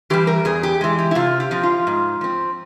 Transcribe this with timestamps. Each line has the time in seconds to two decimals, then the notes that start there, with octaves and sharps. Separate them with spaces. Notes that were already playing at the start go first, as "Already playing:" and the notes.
0.10 E3 G3 G4
0.27 A#4
0.45 E2 G#4
0.63 G4
0.81 E3 G#3
0.98 G4
1.11 E4
1.15 C3 F4
1.40 G4
1.51 F3 C4
1.63 F4
1.87 G#2
2.21 F3 C4